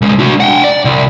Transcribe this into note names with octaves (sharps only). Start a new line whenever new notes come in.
C2 G#3
D4 F#4
F#5 G5
D5
C2